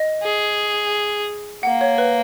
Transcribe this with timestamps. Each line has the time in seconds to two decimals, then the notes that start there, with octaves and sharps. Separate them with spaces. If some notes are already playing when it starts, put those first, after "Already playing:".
Already playing: D#5
0.23 G#4
1.63 A#3 F#5
1.81 C#5
1.98 B4